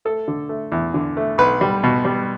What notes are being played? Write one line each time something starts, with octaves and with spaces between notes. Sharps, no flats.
A3 A4
D3
A3
E2
D3
A3
B1 B4
G3
B2
G3